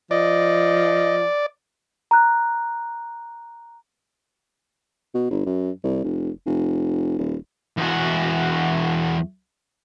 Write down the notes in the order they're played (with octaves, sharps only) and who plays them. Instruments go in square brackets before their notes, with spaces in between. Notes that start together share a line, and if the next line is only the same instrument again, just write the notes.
[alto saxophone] F3 [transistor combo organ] D5 [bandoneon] D#5
[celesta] A#5 F#6
[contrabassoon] B2
G1
F#2
C2
F1
F1
D#1
[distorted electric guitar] E2 F#4